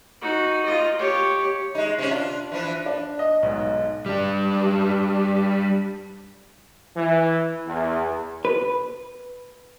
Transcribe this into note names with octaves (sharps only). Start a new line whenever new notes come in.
D#4 F#4
F4 D#5
G4 C#5
G#3 D#4
C3 C#4
D4 F4
E3 F3 D4
D4
D#5
B1 G#2
G3 D4
E3
E2
B4